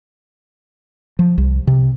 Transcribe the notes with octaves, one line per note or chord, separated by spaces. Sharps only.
F3
C2
C3